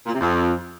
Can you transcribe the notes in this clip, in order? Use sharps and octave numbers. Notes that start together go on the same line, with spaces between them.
A#2
C3
F2